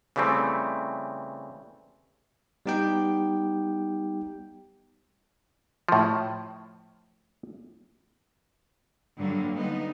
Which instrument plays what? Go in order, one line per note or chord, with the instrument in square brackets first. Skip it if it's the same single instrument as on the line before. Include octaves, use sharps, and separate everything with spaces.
[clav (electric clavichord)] C#3 E3 G3 A3 C4
[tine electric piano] G3 B3 D#4 G4 G5
[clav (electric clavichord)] A2 F3
[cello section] G2 D3 F#3 A#3
D3 G3 B3 D#4